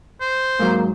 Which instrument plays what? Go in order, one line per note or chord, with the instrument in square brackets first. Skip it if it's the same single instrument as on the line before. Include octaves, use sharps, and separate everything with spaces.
[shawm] C5
[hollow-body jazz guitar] G#2 F#3 [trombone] A#3